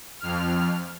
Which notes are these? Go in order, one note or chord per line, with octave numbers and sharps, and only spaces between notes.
F2 F6